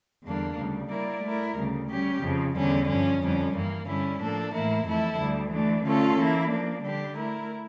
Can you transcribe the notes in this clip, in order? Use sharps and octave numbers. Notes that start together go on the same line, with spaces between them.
E2 D3 G3 A#3 D4
D2 C#3 G3
G3 A#3 E4 A#4 D5
A3 E4 A#4
D2 C#3 G3
G3 C#4 G4
F2 C#3 F3
E2 D3 G3 C#4
G2 F3 C#4
F2 D3 G3 C#4
G2 E3 A#3
G2 D3 G3 C#4 E4
A2 F3 A#3 D4 A4
A2 E3 A#3 E4 A#4
F2 E3 A3 E4 A4
D2 D3 G3
E3 A3 D4
D3 A3 C#4 F4 A4
E3 A#3 E4
F3 A#3 D4
D3 G3 D4 G4
A3 E4 A#4